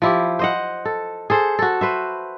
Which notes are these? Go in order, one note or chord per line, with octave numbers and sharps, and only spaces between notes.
F3 E4 G4
C5 D#5 F#5
A4
G#4 A4 C5
F#4 A4
B4 C5 E5